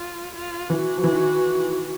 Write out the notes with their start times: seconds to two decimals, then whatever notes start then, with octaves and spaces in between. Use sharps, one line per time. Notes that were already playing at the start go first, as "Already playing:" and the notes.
Already playing: F4
0.35 F4
0.69 E3 F#4
0.97 F3
1.04 E3
1.13 D#3